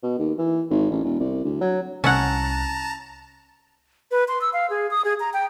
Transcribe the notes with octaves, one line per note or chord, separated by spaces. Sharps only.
B2
D#2
E3
G#1
A1
E1
C2
D2
F#3
C2 C#4 E4 F#5 A5 A#5
B4
C6
E6
F5
G#4
D#6
G#4
A#5
G5